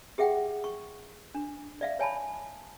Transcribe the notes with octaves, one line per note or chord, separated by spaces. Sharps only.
G4 G#4 E5 F#5 G5
C#6
D4
D5 E5 F5
C#5 G#5 A5 B5